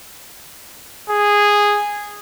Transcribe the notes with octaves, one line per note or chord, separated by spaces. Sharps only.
G#4